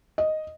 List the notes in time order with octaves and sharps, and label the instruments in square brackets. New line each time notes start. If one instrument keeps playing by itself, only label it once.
[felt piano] D#5